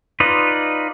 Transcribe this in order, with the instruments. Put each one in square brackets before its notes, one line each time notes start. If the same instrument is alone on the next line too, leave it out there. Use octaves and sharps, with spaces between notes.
[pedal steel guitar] D#4 F4 B4 D5 D#5